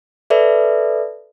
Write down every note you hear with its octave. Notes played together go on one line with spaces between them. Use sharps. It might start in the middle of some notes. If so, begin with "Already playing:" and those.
A4 B4 D5 E5